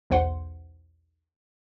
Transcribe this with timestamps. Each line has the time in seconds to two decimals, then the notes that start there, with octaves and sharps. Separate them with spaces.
0.10 B1 E2 C5 F#5 C6